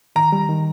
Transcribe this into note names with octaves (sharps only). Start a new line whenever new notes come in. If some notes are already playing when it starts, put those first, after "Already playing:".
D#3 A#5
G3
D#3